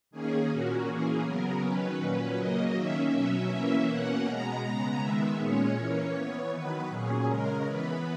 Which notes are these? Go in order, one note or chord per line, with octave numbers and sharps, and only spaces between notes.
D#3 A#3 C#4 G#4
A#2 A#3 C#4 F#4
E3 A#3 C#4 G#4
C#3 F#3 B3 A#4
D#3 F#3 C#4 B4
A#2 F#3 C#4
C#3 F#3 A#3 D#5
D#3 A#3 C#4 E5
B2 F#3 C#4
E3 A#3 C#4 E5
B2 A#3 C#4 F#5
B2 G#3 B3 A#5
C#3 G#3 B3
D#3 G#3 B3 E5
A#2 G#3 C#4 C#5
E3 A#3 C#4
E3 B3
D#3 F#3 B3 B4
A#2 F#3 C#4 G#4
C#3 G#3 C#4 A#4
E3 B3 B4